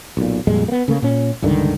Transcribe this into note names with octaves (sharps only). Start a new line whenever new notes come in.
B1 A#2
F2 A#2 G3 G#3
A#3 B3
C#3 A3 A#3
A#2 C#4
C#2 G2 D3 D#3